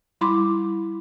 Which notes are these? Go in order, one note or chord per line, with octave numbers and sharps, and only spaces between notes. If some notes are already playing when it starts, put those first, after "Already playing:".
G3 E4 B5 C6 D6